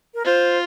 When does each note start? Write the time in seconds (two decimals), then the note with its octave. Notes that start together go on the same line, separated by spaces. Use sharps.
0.14 A#4
0.25 F4 C5